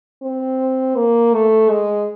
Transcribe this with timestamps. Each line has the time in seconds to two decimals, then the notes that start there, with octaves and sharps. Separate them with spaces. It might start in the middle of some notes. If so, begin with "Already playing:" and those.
0.23 C4
0.96 A#3
1.34 A3
1.70 G#3